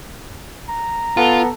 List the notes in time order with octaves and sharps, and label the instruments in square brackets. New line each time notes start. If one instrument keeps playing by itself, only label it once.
[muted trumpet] A#5
[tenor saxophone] B3 [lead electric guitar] F4 [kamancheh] A4